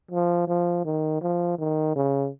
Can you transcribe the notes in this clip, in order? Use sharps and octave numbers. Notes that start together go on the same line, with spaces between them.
F3
F3
D#3
F3
D#3
C#3